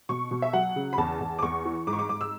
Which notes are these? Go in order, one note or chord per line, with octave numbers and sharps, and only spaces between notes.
B2 C#6
B2
E5
F#3 F#5
C#3
B5
E2 A5
E2
D6
E2 C#6
E3
G#2 D6
C#6
D6
G#2 D6
E6